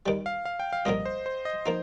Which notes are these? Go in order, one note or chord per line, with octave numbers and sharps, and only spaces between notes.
D#2 D#3 G3
F5
F5
G5
F5
C2 A#2 F3 A#3 D#5
C5
C5
D#5
F3 A#3 D#4